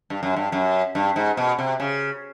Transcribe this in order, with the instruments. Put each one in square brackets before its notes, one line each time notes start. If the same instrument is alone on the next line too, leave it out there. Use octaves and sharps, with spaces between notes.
[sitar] G2
F#2
G2
F#2
G2
G#2
B2
C3
C#3